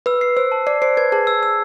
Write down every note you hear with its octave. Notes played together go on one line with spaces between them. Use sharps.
B4 E6
C7
C5 E6
A5
D5 C7
C5 C7
B4 G#6
G#4 A5
E6
E6